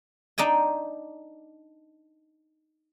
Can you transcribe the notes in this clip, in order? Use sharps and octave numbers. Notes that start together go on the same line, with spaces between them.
D4 D#4 D5 G5 G#5